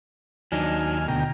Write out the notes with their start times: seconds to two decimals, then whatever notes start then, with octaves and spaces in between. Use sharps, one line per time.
0.52 D#2 F#3 D4 D#4 G#5 F6
1.08 D2 B2 G5 A#5